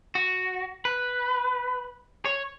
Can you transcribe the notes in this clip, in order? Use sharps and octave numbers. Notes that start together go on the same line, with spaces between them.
F#4
B4
C#5